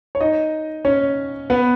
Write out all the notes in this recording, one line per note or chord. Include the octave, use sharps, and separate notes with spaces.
C#5
D#4 D#5
C#4 C#5
B3 B4